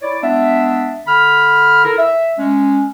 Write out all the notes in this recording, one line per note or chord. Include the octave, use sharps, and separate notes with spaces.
E4 C#5 D5
G#3 B3 D4 E5
D3 B5 F6
E4 A4 A#4
E5
G#3 C#4